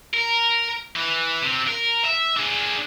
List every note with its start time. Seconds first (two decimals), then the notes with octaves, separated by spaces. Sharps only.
0.14 A#4
0.96 E3
1.42 C3
1.68 A#4
2.05 E5
2.37 D4 G#4